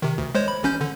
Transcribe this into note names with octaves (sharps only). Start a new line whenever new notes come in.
C3 D#3
D2
G#3 C5 C#5
B5
A1 C#4 G6
D3